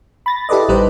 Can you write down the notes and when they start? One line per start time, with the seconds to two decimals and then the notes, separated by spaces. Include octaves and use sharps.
0.26 B5 A6 A#6
0.49 E4 G4 A4 B4 D5 D#5
0.69 A1 G3 D#4 B4 C5 D#5